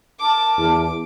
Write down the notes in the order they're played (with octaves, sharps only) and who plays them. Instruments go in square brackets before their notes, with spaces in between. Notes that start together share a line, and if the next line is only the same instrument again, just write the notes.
[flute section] A#4 A5 [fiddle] D6
[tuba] E2